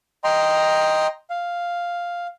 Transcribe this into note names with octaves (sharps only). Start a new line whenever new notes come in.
D#5 G5 A#5 C6
F5